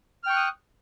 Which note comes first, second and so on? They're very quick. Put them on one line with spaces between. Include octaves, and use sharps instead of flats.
F6 G5 C#6 F#6 D#6